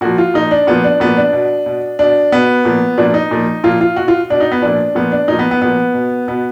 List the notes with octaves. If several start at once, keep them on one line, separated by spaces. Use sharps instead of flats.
A#2 F3 F#4
F4
A#2 F3 D#4
D4
A#2 F3 B3
D4
A#2 F3 B3
D4
B2
B2
B2 D4
B2 B3
A#2 F3
A#2 F3 D4
D#4
A#2 F3
A#2 F3 F4
F4
B2 F#4
F4
B2 D4
D#4
B3
A#2 F3 D4
A#2 F3 B3
D4
A#2 F3 D#4
B3
B3
A#2 F3 B3
B2
B2 B3